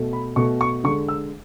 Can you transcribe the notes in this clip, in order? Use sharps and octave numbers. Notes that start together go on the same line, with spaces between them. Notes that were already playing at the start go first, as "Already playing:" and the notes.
Already playing: B2 A3
B5
B2 A3 C#6
C#6
D3 G#3 C#6
E6